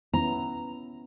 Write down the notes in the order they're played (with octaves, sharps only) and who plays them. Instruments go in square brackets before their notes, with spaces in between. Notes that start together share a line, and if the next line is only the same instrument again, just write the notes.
[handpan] B3 C#4 E4 [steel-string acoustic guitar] A#5